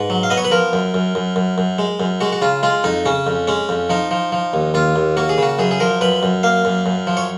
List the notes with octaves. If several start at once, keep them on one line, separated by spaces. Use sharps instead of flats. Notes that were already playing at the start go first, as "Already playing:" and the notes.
Already playing: G#2 B4
F#3
F5
B3 D#5
C#5
B4
F3 A#4
F#2
F#2
F#2
F#2
F#2
G#3
F#2
G#3 F#4
F#4
C#3 F4
G#3 F4
F2 D#4
C#3 C#4
F2
G#3 C#4
F2
F3 D#4
F3
F3
D#2
D#2 F4
D#2
A#3 F#4
G#4
C#3 F#4
F#2 G#4
G#4
F3 A#4
F#2 B4
F#2
A#3 F5
F#2
F#2
F3
C#5